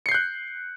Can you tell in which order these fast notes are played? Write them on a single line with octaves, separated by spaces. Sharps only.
C#7 C7 G6 F#6